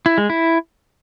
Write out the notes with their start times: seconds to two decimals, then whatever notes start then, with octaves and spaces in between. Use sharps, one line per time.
0.06 E4
0.18 G#3
0.30 E4